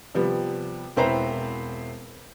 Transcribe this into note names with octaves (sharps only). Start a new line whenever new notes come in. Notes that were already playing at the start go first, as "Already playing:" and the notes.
C3 F3 G3 B3
E1 C4 E4 B4 C5 A#5